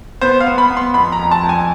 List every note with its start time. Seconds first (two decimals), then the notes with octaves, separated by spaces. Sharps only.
0.21 B3 C5
0.40 F5
0.46 B3
0.58 B5
0.70 B3
0.77 C6
0.94 F2 B5
1.12 A#5
1.19 F2
1.31 A5
1.43 F2
1.49 G#5